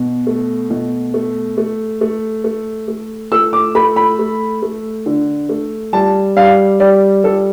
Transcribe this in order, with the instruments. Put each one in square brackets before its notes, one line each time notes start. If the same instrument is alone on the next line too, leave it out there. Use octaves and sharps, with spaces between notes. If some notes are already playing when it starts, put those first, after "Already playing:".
Already playing: [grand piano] B2
A3
B2
A3
A3
A3
A3
A3
A3 E6
D6
A3 B5
B5
A3
A3
D3
A3
G3 A5
G3 F5
G3 D5
G3 A4